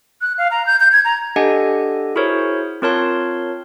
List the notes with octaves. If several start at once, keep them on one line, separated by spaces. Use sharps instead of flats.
F#6
F5
A#5
G6
G6
G#6
A#5
D4 G4 A4 D#5 F#5 G#5
E4 F#4 G#4 A#4 C5 C#5
C4 F4 A#4 C#5 A5 C6